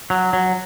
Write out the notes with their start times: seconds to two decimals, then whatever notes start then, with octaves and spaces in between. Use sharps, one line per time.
0.10 F#3
0.33 F#3